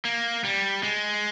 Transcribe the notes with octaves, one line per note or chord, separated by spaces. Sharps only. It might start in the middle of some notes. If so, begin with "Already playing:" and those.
A#3
G3
G#3